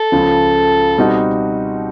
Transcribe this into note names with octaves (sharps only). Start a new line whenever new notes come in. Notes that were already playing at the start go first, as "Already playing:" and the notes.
Already playing: A4
C#2 C#3 F3
B2 G3 C4 D#4 F#4